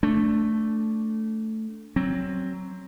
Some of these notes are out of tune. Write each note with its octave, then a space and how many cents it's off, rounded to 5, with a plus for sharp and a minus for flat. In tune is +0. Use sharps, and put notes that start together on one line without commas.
A3 +0 D4 -15
F#3 +15 C4 +20